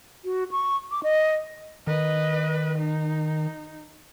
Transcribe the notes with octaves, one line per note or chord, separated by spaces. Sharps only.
F#4
C#6
D6
D#5
D#3 B4 D#5
D#4